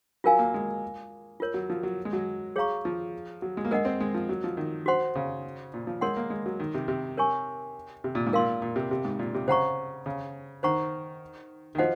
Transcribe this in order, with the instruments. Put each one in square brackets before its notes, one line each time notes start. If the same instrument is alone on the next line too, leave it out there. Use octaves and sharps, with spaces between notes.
[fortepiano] F#3 [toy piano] F4 A#4 F5 G#5
[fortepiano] A#3
G#3
[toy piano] F4 A#4 C#5
[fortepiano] F#3
F3
F#3
G#3
F#3
[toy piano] G#4 C#5 F5 A#5 C#6
[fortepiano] F3
F#3
G#3
A#3
[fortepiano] G#3 [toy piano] A#4 D#5 F#5
[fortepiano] C4
G#3
F3
F#3
F3
D#3
[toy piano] F#4 C5 F#5 C6
[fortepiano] C#3
A#2
F3
[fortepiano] G#3 [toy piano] A#4 C#5 F#5 C6
[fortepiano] A#3
G#3
F#3
D#3
C3
C3
[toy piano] A#4 C#5 G#5 C#6
[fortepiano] C3
A#2
G#2
[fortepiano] A#2 [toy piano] A#4 F5 C6
[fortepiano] A#2
C3
C3
G#2
A#2
C3
[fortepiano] C#3 [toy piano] C5 F#5 A#5 C#6
[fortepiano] C#3
[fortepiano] D#3 [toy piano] C5 F#5 A#5 C#6
[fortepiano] D#3
[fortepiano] F3 [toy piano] F#4 C5 D#5 F#5